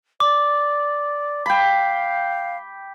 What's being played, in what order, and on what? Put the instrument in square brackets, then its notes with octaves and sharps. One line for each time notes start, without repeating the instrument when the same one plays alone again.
[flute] D5 [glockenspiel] D6
[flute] F5 [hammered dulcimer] G5 B5